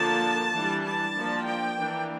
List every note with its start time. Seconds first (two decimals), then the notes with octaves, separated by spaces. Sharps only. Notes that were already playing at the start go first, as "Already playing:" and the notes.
Already playing: D3 F3 A#3 D4 A5
0.54 E3 G3 D4
0.85 A5
1.16 F3 A#3 D4
1.47 G5
1.78 E3 A#3 D4